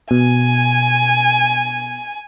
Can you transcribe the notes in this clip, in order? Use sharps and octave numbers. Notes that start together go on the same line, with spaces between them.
B2 G#5